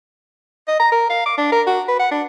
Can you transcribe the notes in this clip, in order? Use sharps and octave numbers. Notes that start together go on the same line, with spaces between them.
D#5
A#5
A#4
F5
D6
D4
A#4
F#4
B4
F#5
D4